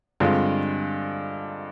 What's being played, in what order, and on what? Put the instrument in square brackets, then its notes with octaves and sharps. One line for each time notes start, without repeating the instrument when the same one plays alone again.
[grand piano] G2 D3 G#3 C4 F4